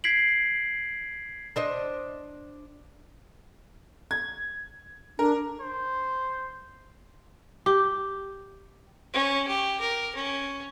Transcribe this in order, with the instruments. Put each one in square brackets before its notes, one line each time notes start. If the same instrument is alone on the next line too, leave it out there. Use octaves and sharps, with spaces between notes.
[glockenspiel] G#6 B6 C7 D7 F#7
[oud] D4 C5 D#5
[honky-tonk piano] G#6
[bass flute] D4 [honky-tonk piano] A#4
[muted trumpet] C5
[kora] G4
[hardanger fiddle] C#4
G4
A#4
C#4